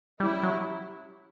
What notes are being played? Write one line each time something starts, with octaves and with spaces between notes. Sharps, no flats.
G3 C#4 E4 G4
F#3